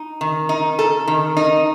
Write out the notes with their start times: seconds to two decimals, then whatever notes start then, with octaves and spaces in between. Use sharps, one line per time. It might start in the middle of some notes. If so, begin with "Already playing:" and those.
Already playing: D#4
0.21 D#3
0.49 D#4
0.79 A4
1.07 D#3
1.37 D#4